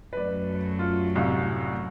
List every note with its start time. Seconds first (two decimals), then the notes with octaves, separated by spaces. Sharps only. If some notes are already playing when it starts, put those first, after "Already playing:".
0.13 F#2 F#3 A3 B4 D5
0.79 F4
1.16 C2 A2 F5